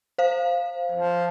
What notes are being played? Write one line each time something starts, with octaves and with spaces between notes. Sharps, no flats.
C5 F5
F3